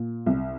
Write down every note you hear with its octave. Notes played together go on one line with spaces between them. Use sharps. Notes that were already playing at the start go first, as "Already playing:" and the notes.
Already playing: A#2
C2